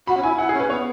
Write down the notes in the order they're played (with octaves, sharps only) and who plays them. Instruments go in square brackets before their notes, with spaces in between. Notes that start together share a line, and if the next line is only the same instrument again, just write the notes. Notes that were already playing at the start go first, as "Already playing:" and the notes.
[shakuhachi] F#4 [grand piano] B5
[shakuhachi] C#4
[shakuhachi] E4 [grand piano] G#5
[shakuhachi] E4 [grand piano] F#5
[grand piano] G#4
[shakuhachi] C#4
[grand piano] B4
[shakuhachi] B3 [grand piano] C#5